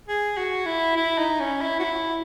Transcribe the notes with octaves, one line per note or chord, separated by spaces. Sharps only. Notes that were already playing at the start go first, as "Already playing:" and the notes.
G#4
F#4
E4
E4
D#4
C#4
E4
F#4
E4